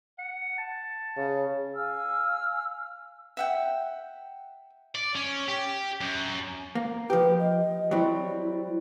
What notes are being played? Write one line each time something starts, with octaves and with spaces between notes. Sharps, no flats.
F#5
A5
C#3
F5 G#5 E6 F6
E5 F#5 G5
D5
C#4
G4
F#2
A#3
F3 G4 B4
D#5
F#3 G3 C4 E4